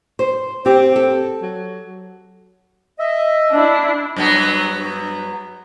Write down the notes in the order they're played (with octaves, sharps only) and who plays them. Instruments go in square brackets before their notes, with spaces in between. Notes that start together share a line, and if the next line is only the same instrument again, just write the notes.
[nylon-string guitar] C5
[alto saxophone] C4 [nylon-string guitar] G4
[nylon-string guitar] A4
[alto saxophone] F#3
[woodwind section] D#5 E5
[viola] D4 E4
[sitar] G2 F#3 B3